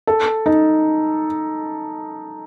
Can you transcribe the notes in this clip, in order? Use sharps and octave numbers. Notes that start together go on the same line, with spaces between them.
A4
D#4